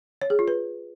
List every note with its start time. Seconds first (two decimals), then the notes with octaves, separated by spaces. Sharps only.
0.22 C#5
0.30 G#4
0.39 F4
0.48 B4